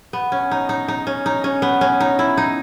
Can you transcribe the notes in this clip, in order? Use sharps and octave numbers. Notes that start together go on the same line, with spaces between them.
B3
C#4
D#4
D#4
D#4
C#4
D#4
C#4
B3
C#4
D#4
E4
D#4